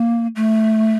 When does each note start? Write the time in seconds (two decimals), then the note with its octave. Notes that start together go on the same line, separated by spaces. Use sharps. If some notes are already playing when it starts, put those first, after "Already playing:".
Already playing: A#3
0.36 A3